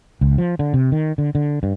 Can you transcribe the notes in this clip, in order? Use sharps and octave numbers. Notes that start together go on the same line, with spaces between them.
C#2
F3
D3
C3
D#3
D3
D3
G2